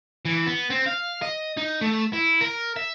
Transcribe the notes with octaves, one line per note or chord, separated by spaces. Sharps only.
E3
B3
C4
F5
D#5
D#4
A3
E4
A#4
E5